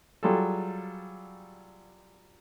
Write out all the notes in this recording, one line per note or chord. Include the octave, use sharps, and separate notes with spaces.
F#3 G3 F4 G#4 A4